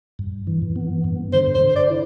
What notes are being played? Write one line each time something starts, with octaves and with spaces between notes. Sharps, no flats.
G2
E3
B3
G2
D3 C5
C5
D3
C5
D5
E4